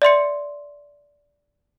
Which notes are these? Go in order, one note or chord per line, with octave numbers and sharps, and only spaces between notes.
D5 E5 C6 C#7